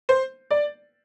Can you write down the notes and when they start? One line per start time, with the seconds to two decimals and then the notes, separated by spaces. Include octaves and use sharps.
0.09 C5
0.51 D5